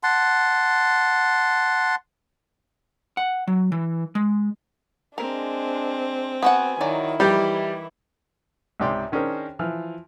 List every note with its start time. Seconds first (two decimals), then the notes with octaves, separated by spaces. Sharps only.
0.03 F#5 A5 C6
3.17 F#5
3.47 F#3
3.72 E3
4.15 G#3
5.18 G#3 C4 D4 A#4
6.43 B3 F#4 F#5 G#5
6.81 D#3 F#3 E4 D5
7.20 D#3 E3 G3 G4
8.80 C#2 G#2 C3 D5 G5 C6
9.12 D#3 C#4 D4 G#4 A#4 C5
9.59 E3 F3 F6